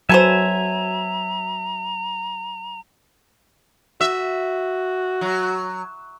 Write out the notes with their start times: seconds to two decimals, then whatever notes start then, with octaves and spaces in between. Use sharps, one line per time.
0.09 F#3 B3 A4 C5 E5 G#5 A#5
4.01 F#4 E5
5.21 F#3